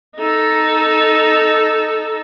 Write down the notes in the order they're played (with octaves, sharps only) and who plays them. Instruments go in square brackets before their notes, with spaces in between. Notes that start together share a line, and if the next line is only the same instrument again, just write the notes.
[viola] D#4 A4